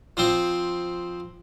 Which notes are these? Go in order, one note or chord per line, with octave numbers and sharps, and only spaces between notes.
F3 C4